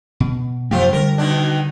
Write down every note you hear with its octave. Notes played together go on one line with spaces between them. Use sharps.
B2
F#2 C3 F3 A3 F4 G4
D3 G3 A#4
B2 D#3 D4